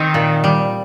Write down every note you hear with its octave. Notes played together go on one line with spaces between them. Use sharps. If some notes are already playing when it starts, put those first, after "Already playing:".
Already playing: D#3 C4
A#2
G3